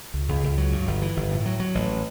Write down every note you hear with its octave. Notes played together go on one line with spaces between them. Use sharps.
C#2
C#2
C#2
F#3
G2
G1
E3
G1
A2
F#3
F#3
A1